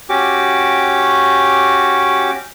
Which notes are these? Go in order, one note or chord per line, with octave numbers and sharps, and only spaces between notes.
C#4 F#4 G4 D6